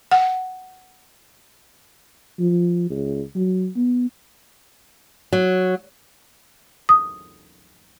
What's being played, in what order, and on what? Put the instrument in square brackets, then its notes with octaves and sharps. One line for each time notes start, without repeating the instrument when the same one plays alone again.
[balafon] F#5
[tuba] F3
C#2
F#3
B3
[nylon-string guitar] F#3
[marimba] D#6